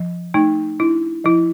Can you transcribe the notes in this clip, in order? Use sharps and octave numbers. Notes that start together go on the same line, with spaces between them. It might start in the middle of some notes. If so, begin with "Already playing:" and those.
Already playing: F3
A3 D#4
D4 E4
F3 E4